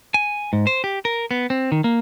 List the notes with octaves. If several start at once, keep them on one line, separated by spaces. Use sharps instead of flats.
G#5
G#2
C5
G4
A#4
B3
C4
D#3
A#3